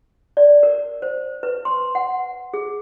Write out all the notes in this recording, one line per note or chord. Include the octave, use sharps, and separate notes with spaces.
D5
A#4
C5
B4
C6
F#5
G#4